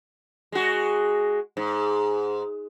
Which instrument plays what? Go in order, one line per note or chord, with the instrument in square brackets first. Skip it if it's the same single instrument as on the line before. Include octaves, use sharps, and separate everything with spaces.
[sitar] G#3 F#4
G#2